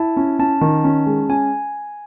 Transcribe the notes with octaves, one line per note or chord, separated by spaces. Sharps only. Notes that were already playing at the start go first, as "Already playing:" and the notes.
Already playing: E4 A5
C#4
C#4 A5
D#3
C#4
G#3
C#4 G#5